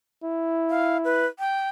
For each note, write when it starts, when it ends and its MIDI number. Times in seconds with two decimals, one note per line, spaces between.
0.24 1.27 64
0.70 0.97 77
1.05 1.26 71
1.39 1.69 79